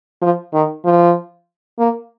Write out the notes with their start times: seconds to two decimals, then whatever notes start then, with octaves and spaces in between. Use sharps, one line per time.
0.22 F3
0.53 D#3
0.85 F3
1.79 A#3